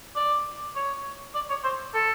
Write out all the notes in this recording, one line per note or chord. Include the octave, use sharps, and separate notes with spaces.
D5
C#5
D5
C#5
C5
A4